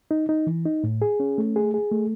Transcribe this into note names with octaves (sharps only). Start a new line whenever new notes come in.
D#4
D#4
E3
D#4
A2
G#4
C#4
A3
G#4
G#4
A3